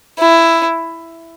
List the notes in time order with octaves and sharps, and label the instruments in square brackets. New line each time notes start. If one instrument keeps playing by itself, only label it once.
[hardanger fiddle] E4